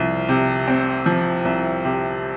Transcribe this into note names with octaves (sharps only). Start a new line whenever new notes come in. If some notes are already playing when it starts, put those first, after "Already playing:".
Already playing: C2 F3
C3
C4
F3
C2
C3